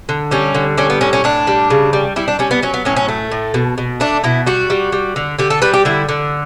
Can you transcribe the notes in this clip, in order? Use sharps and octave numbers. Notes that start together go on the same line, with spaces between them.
D3
G3 C#4
D3
G3 C#4
B3
A2 C#4
C#4
A2 D4
G3
C#3
G3
G3 E4
D4
G3 C#4
B3
F#3 C#4
B3
A2 C#4
C#4
A3
A2
B2
B2
A3 D4
B2 E4
G3 F#4
G3
G3
D3
D3 G4
A4
G3 B4
G4
D3 E4
D3